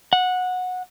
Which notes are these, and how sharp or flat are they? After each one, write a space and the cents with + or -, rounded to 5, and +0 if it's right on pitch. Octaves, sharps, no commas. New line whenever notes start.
F#5 -15